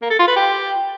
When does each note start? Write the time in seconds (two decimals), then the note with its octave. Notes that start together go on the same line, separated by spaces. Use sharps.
0.02 A#3
0.10 A4
0.19 F4
0.27 B4
0.36 G4